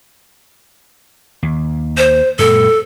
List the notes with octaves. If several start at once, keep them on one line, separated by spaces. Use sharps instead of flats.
D#2
C5
F#2 A#2 G#3 A4